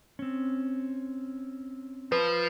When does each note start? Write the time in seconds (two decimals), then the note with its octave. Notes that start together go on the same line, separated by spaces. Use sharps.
0.19 C4 C#4
2.12 F3 B4